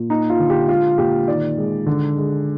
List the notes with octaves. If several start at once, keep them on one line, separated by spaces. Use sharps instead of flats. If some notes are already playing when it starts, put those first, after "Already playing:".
Already playing: A#2
A#3 D#4
F4
D3
G4
G#3 F4
A#2 G4
D#3 D5
G#3
D3
G#3